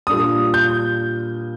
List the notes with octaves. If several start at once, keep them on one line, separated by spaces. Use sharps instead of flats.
A#2 G3 D4 D#6
G6